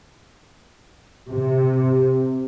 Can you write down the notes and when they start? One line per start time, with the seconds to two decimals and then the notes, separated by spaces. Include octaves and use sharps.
1.28 C3